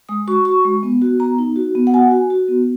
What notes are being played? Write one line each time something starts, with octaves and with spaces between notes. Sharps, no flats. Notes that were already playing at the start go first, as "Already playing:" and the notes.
G#3 D#6
F#4 C#6
F#4 C#6
G#3
B3
F#4
B3 A#5
D#4
F#4
B3
F#5
F#4 G#5
F#4
F#4
B3